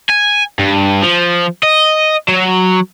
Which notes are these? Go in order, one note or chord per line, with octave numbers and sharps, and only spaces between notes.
G#5
G2
F3
D#5
F#3